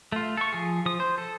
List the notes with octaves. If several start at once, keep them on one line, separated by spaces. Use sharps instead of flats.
A3 F4
A4 C#6
F3 G#4
F3 D#6
C5
A4